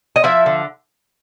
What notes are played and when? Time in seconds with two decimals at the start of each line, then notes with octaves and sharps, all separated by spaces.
0.16 D#5
0.24 F3 E4 E5
0.46 D3